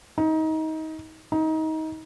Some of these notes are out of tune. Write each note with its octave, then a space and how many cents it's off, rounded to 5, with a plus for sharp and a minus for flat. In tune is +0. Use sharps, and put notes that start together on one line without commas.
D#4 +25
D#4 +25